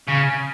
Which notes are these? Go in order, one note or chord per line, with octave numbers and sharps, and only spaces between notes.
C#3